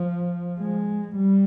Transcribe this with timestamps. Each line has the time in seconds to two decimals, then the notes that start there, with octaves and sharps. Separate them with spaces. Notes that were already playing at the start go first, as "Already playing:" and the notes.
Already playing: F3
0.60 G#3
1.15 G3